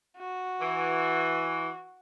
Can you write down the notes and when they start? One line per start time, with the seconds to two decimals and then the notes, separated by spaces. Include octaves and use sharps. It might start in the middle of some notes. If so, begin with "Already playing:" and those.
0.18 F#4
0.61 E3